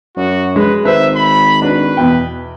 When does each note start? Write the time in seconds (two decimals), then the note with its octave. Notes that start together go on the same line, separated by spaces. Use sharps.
0.17 F#2 F#4
0.56 G#3 B4
0.85 G#1 B4 C5 E5
1.15 B5
1.62 D4 F#4 B4
1.97 E2 B2 G5